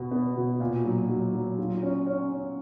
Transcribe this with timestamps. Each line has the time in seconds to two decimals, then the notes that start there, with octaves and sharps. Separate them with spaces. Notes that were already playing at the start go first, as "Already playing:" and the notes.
Already playing: B2 B3
0.11 B3
0.35 B2
0.60 A#2
0.84 F#3
1.09 F#3
1.34 F#3
1.58 F4
1.82 C#4
2.06 C#4
2.31 C#4